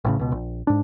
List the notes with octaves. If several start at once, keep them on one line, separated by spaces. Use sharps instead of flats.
A1 A2 C#3
C#2 B2
A#1
G#2 D4